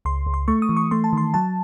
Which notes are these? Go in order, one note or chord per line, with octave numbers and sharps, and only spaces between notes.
C#2 C6
C#2
C6
A3 C#6
D#6
E3
C#6
A3 C6
A5
D#3 C6
F#3 A5